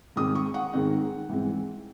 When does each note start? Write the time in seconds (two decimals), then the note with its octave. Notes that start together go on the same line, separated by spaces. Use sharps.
0.16 G#2 D#3 G#3 C4 D#4 D#6
0.35 C#6
0.54 F#5
0.73 G#2 D#3 G#3 C4 D#4
1.29 G#2 E3 G#3 C4